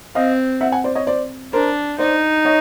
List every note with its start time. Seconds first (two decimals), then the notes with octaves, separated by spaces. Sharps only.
0.15 C4 D#5 F5
0.61 E5 F#5
0.72 F#5 G#5
0.84 C5 D5
0.95 C#5 D#5
1.07 C5 D5
1.53 D4 A#4 C5
1.99 D#4 C5 D5
2.45 C#5 D#5